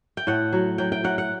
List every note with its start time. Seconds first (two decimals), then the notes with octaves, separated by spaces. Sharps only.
0.17 G5
0.27 A2 F#5
0.53 F#3
0.78 F#3 G5
0.92 G5
1.04 F#3 F#5
1.18 F#5